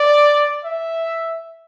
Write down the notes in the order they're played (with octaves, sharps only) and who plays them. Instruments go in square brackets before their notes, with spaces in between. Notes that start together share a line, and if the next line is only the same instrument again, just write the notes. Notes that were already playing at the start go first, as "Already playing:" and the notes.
Already playing: [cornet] D5
E5